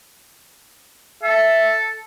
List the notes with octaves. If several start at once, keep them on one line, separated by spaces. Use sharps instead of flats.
A4 E5